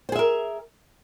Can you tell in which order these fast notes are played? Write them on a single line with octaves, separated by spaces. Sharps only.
C5 G#4 E5 A#4